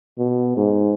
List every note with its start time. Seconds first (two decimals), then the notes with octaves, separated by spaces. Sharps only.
0.18 B2
0.57 G#2